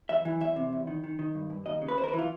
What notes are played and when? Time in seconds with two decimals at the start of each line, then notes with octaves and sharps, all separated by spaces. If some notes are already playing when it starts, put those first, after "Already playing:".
0.09 E2 E5
0.25 E3
0.41 E2 E5
0.56 C3
0.73 E2
0.87 D#3
1.04 D#3
1.19 D#3
1.35 G2
1.50 G2
1.66 D#2 D#5
1.82 C#3
1.88 B4
1.98 D#2 C5
2.04 A#4
2.08 B4
2.13 E3
2.19 F4